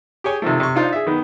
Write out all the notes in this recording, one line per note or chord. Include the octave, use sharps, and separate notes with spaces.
G4 G#4 C#5 G#5
C3 D#3 F3 A3
C3 C#6
D4 D#4 F4 C5
G#4 E5
D#3 B3